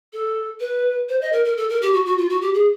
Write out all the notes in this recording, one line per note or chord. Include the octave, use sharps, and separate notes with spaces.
A4
B4
C5
D#5
A#4
A#4
A4
A#4
G4
F#4
F#4
F4
F#4
G4
G#4